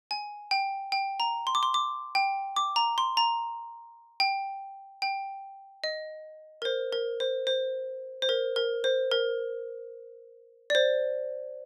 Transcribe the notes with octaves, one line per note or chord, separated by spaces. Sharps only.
G#5
G5
G5
A#5
C6
D6
C6
D6
G5
D6
A#5
C6
A#5
G5
G5
D#5
A#4
C5
A#4
C5
C5
C5
A#4
A#4
C5
A#4
D5
C5